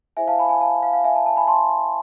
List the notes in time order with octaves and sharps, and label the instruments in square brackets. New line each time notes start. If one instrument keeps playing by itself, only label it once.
[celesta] E4 G#4 C5 E5 G#5
F5 A5
G#5 B5
G#5 B5
F5 A5
F5
F5
E5 G#5
F5 A5
F5 A5
G#5 B5
A5 C6